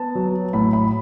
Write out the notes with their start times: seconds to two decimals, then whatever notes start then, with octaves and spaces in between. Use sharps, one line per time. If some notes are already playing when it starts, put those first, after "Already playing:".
Already playing: B3 A5
0.15 F#3
0.53 A2 B5
0.73 B5